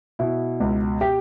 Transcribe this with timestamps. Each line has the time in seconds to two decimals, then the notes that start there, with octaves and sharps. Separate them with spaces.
0.19 B2 E4
0.60 C#2
1.01 G4